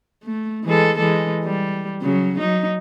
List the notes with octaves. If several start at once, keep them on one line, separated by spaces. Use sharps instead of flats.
A3
E3 G#3 A4
E3 G#3 A4
G3
C#3 F#3
F#3 D#4